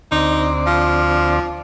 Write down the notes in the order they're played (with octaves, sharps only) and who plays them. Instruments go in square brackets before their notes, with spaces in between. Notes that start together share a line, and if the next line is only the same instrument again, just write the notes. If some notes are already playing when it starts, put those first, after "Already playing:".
[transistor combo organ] D2 C4 D5 [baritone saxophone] D#4
[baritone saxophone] F3